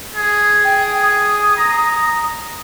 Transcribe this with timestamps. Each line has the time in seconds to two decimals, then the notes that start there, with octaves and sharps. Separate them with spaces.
0.15 G#4
0.64 G5
1.02 D#6
1.57 A#5